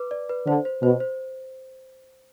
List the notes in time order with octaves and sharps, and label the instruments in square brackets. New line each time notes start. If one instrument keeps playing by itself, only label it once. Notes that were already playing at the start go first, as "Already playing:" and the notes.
Already playing: [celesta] B4 D6
D5
B4
[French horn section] D3 [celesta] C5
[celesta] C5
[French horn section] B2 [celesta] C5
[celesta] C5